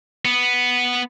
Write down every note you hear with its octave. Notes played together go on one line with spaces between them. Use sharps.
B3